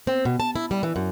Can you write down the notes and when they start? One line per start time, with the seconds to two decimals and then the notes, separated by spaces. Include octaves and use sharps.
0.07 C4
0.25 B2
0.40 A5
0.56 E4
0.71 G3
0.83 E3
0.96 F#2